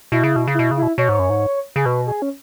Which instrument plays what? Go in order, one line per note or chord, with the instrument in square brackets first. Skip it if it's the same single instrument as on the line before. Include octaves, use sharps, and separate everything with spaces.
[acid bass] B2 [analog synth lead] E4
[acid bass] C#3
B2
C#3
[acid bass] B2 [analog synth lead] E4
[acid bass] C#3
[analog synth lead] E4
[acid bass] B2
[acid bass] B2 [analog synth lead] C#5
[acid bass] G#2
F#2
G#2
[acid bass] C#3 [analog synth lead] G#4
[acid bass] B2 [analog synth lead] B4
[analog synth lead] G#4
C#4